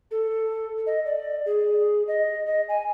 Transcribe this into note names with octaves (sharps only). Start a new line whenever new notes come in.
A4
D#5
D5
G#4
D#5
D#5
G#5